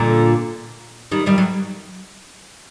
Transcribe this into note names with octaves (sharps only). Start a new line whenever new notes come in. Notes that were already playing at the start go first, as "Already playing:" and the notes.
Already playing: A#2 D3
D#3 G3
D#3 G3
F#3